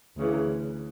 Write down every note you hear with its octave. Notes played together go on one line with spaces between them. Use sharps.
D2 C#3 E3